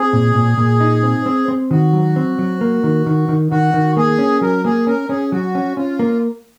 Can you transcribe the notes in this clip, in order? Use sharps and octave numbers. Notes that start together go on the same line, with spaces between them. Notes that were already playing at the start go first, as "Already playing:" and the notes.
Already playing: C4 G#4
A#2
A#2
A#2
D#4
C4
C4
C4
D#3 F#4
F#3
C4
F#3
A#3
D#3
D#3
D#3
D#3 F#4
D#3
A#3 G#4
C#4
F#3 A#4
A#3 G#4
C#4 A#4
C#4 G#4
F#3 F#4
C#4
C#4 F4
A#3